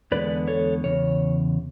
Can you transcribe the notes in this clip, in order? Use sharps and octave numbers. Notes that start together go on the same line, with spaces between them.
E2 D3 G#3 B3 B4 D5
A4 C#5
E2 C#3 C#5